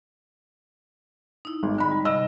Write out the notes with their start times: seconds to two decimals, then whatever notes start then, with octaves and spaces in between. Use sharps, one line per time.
1.45 D#4 E4
1.63 G#1
1.78 D3 D#4 B5
1.91 G3
2.05 G2 C3 D#5 E6